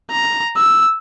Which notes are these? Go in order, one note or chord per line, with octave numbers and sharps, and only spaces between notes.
A#5
E6